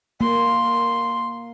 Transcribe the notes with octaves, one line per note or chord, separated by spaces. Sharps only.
A#3 C6